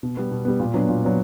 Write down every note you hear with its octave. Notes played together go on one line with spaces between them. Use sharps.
B2
G3 B3
B2
G3 B3
A#2
F#3 B3 D4
A#2
F#3 B3 D4